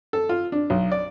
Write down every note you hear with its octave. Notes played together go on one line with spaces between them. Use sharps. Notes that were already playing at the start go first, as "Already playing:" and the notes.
A4
F4
D4
B1
D5